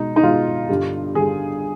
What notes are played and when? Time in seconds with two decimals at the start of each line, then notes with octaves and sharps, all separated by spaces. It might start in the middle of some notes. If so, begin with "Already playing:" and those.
Already playing: B2 G#3 D#4
0.16 D#4
0.23 B2 G#3 F4
0.69 G2 D3 G3
1.15 G2 D3 G3 G#4